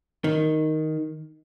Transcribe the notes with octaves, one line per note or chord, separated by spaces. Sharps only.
D#3